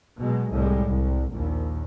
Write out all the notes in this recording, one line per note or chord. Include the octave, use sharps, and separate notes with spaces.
B2 F#3 G#3
C2 A2 G3 G#3
C2
A#1 D#2